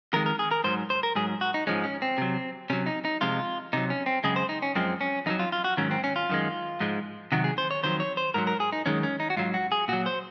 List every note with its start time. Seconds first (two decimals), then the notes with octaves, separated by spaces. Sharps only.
0.13 F2 D#3 G#3 A#4
0.26 A#4
0.39 G#4
0.51 A#4
0.64 G#2 F#3 C5
0.90 C5
1.03 A#4
1.15 G#2 F#3 G#4
1.41 F#4
1.54 D#4
1.67 G#2 F3 G#3 C#4
1.84 C#4
2.02 C4
2.18 C3 F#3
2.70 C3 F#3 C#4
2.86 D#4
3.05 D#4
3.21 F2 C3 F3 G#3 F4
3.73 C3 F#3 D#4
3.90 C#4
4.06 C4
4.24 F#2 C#3 G#3 G#4
4.36 C5
4.49 D#4
4.62 C#4
4.75 F#2 F3 G#3 C4
5.01 C#4
5.26 F2 D#3 F#3 D#4
5.39 F4
5.52 F4
5.64 F#4
5.77 G#2 D#3 F#3 C#4
5.91 C4
6.04 C#4
6.16 F4
6.29 F#2 D#3 G#3
6.80 G#2 F3 G#3
7.32 C3 D#3 F#3 F#4
7.44 G#4
7.58 C5
7.71 C#5
7.83 F2 D#3 F#3 C5
8.00 C#5
8.17 C5
8.34 G#2 F#3 A#4
8.47 A#4
8.60 G#4
8.72 D#4
8.86 F#2 D#3 G#3 C#4
9.03 C#4
9.20 D#4
9.30 F#4
9.37 G#2 F#3 F4
9.54 F#4
9.72 G#4
9.88 A#2 F#3 F#4
10.06 C5